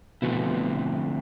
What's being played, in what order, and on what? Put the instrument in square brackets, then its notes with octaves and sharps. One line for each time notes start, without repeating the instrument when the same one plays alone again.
[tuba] B2 [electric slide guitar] D3 F3 A3 C4 E4